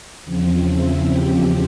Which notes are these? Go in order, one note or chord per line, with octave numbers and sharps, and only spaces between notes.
E2 C#3 F3 C4
E4
G4